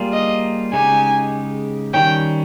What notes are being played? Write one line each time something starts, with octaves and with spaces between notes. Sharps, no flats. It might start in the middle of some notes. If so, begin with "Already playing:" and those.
Already playing: G3 A#3 F4 G#4
D#5
C#3 G#3 D#4 G4 G#5
D#3 G3 C#4 G5